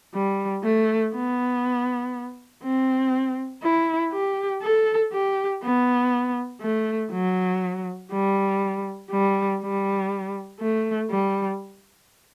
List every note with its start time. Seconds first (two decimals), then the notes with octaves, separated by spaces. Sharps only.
0.14 G3
0.63 A3
1.14 B3
2.63 C4
3.63 E4
4.12 G4
4.62 A4
5.12 G4
5.63 B3
6.61 A3
7.12 F#3
8.12 G3
9.11 G3
9.61 G3
10.60 A3
11.10 G3